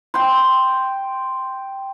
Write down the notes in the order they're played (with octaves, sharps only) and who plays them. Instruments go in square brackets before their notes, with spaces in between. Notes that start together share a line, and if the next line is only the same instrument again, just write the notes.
[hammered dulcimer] G5 C6